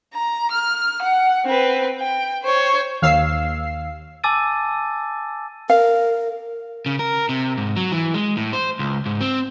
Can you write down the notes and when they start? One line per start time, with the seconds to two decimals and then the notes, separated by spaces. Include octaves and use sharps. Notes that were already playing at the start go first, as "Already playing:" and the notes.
0.15 A#5
0.52 F6
1.03 F#5
1.46 C4 B4
1.99 G5
2.44 C5 C#5
3.02 D#2 F5 E6 C7
4.24 G#5 A5 D6 E6 A6 D#7
5.70 A#4 F5
6.86 C#3
6.99 A#4
7.29 C3
7.57 G#2
7.77 F#3
7.92 E3
8.14 G#3
8.37 A2
8.53 C5
8.79 C#2
9.06 G#2
9.21 C4